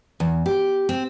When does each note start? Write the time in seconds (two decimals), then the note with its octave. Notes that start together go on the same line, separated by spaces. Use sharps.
0.20 E2
0.46 G4
0.89 C4